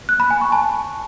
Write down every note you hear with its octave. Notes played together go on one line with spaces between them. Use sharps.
F#6
B5
G#5
C#6
A5